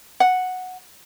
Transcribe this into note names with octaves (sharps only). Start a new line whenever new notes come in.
F#5